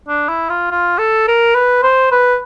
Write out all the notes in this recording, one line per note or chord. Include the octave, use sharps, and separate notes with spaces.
D4
E4
F4
F4
A4
A#4
B4
C5
B4